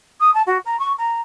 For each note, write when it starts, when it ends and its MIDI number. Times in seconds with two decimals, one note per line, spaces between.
0.20 0.33 87
0.34 0.42 81
0.46 0.58 66
0.65 0.79 82
0.79 0.92 85
0.98 1.20 82